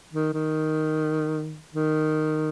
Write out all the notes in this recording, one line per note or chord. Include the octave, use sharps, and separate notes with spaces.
D#3
D#3
D#3